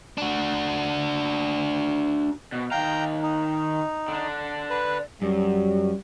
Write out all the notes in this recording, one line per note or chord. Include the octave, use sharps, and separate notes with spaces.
D4 F#4
B2
D#3 F5 G5 A#5
D#4
D3 D4
B4
F#2 G3